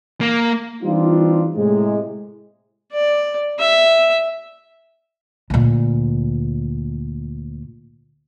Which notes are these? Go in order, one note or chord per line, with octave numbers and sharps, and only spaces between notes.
A#3
E3 G3 C4 D4 D#4 F4
A2 C3 G#3
D5
E5
D2 A#2